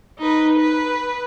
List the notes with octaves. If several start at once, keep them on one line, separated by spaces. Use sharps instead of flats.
D#4 B4
B4